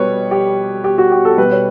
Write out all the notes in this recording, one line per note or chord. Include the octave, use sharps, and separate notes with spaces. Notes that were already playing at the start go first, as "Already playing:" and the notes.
Already playing: B2 G3 B4 C#5
G4
G4
F#4
G4
A4
B2 G3 B4
C#5